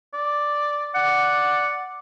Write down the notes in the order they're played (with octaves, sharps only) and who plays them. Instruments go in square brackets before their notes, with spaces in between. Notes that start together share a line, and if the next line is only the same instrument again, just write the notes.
[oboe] D5
[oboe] D5 [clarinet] F#5